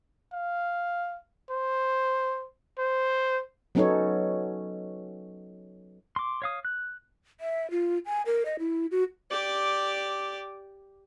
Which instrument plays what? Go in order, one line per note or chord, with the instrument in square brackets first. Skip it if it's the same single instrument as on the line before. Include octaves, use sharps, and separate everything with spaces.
[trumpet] F5
C5
C5
[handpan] F#3 B3 C#4 D#4 A4 C#5
[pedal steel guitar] C6 D6
C#5 F5 D#6
F#6
[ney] E5
F4
G#5
A#4
D#5
E4
F#4
[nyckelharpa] G4 D5